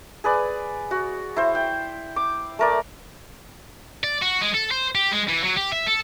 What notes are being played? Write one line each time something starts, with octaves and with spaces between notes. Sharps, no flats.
G#4 B4 D5
F#4
E4 C5
G5
D6
A3 A#4 D5
D5
F#4
G#3
A4
C5
G4
G#3
E3
F#3
G4
E5
A4